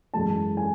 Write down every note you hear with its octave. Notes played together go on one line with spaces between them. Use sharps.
F#2 E3 G#3 A5
G#5